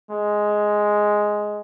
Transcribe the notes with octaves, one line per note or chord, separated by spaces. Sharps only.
G#3